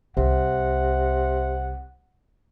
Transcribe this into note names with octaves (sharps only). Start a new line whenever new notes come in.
C2 C3 F#5